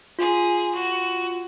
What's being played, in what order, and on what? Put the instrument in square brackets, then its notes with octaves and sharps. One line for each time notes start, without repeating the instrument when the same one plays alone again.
[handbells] F4 [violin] G#4
[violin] F#4